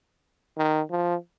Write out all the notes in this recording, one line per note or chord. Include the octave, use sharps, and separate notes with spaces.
D#3
F3